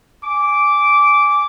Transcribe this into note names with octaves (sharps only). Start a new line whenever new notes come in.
G#5 D6